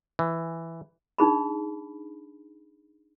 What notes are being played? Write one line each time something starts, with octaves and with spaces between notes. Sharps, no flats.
E3
D4 D#4 G#4 B5